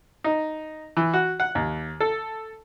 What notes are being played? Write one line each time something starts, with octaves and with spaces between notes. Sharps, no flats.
D#4
E3
F#4
F#5
D#2
A4